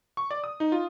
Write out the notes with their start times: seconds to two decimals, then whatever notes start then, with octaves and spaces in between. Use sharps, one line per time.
0.17 C#6
0.31 D5
0.44 D#6
0.60 D#4
0.72 F4